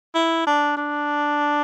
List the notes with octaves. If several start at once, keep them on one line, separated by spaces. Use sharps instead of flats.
E4
D4
D4